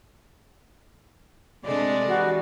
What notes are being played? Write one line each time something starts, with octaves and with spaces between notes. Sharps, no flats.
C3 G#3 A3 D4 D5
E3 G3 F#4